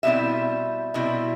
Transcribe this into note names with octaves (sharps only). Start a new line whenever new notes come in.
B2 G3 C4 E4 E5
B2 G3 C4 E4